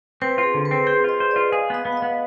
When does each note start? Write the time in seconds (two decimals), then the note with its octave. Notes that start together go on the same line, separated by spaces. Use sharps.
0.22 C4 B4
0.38 F4
0.43 G#4
0.54 D3
0.65 B4
0.71 C4
0.87 G#4 C5
1.04 F4 D#5
1.20 C5
1.31 F4 D5
1.52 G#4 F5
1.70 B3 D#5
1.85 B3
1.92 F5
1.97 D#5
2.02 B3